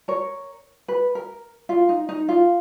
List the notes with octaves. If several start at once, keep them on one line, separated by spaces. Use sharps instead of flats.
A#4 C#5
B4
A#4
F4
D#4
D#4
F4